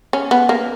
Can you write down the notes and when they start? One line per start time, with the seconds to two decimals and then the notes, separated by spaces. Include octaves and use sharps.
0.13 C#4
0.31 B3
0.49 A#3